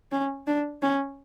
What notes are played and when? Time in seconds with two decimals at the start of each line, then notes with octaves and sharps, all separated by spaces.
0.12 C#4
0.47 D4
0.82 C#4